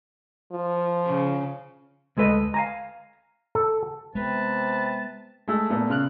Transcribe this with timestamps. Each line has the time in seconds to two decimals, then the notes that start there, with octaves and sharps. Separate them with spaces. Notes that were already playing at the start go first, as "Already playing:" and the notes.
0.52 F3
1.07 C#3
2.17 D2 G#3 A4 B4 D#5
2.54 F5 G#5 A#5
3.55 A4
4.15 C3 G#3 B3 B4 A5
5.48 G#3 A3
5.70 A#2 A3 B3
5.90 C#3 F6 F#6